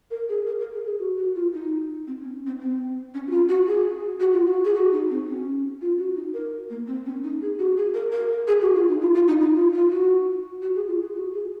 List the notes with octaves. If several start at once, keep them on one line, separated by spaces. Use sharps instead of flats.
A#4
G#4
A#4
A#4
G#4
G#4
F#4
F#4
F4
D#4
C4
C#4
C4
C4
C#4
F#4
F4
F#4
G#4
F#4
F4
F#4
G#4
F#4
D#4
C4
C#4
F4
F#4
D#4
A#4
A#3
C4
C#4
D#4
G#4
F#4
G#4
A#4
A#4
A#4
G#4
F#4
F4
D#4
F4
F4
D#4
D#4
F4
F4
F#4
F#4
G#4
F4
G#4
F#4
G#4